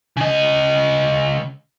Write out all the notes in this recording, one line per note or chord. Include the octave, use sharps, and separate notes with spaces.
C#3 D#5